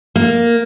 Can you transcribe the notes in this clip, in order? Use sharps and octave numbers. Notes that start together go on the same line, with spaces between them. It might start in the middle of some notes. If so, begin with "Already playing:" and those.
A#3